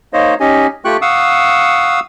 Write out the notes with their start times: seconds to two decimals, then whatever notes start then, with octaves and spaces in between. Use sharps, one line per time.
0.13 A#3 D#4 C5 C#5 D#5
0.40 C#4 D#4 G4 D#5 G#5
0.85 A3 F4 G4 G5 C#6 F#6
1.02 F5 F#5 C#6 D#6 E6